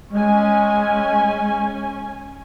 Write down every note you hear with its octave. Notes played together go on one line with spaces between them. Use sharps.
G#3 C#4 G#5